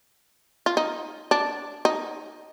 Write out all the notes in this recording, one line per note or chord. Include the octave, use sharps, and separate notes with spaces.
F4
D#4
D4
D#4